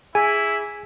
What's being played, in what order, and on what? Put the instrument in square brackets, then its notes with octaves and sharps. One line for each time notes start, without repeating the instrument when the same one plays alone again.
[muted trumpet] E4 [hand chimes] G#4 [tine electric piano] G#5